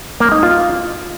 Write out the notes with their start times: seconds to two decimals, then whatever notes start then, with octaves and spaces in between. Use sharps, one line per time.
0.20 A#3
0.32 D#4
0.43 F4